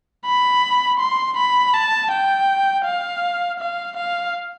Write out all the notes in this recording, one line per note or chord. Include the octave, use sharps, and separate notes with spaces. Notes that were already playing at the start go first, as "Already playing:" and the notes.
B5
C6
B5
A5
G5
F5
F5
F5